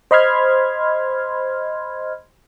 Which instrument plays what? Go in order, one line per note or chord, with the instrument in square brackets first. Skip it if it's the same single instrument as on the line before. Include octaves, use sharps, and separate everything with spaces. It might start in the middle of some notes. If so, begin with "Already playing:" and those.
[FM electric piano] C5 D#5 B5 C6 F6 G#6